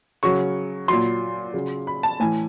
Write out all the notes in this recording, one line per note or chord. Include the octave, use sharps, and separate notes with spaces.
C#3 F#3 C#6
A#2 F#3 C6
C#3 F#3
B5
A5
A2 E3 G#5